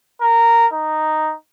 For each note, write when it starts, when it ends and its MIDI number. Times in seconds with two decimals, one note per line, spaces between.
0.21 0.67 70
0.73 1.33 63